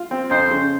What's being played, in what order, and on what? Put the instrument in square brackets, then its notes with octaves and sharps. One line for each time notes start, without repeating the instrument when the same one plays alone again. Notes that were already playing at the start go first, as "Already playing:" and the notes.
Already playing: [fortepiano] F4
C4
[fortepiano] F2 [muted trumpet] C5
[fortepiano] C#3